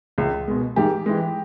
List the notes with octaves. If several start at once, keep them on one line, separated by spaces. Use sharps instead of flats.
C#2
B2 G#3
G#2 G4
E3 G#3